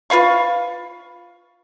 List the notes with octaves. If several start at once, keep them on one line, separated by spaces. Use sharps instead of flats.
F4 B4 F5 C#6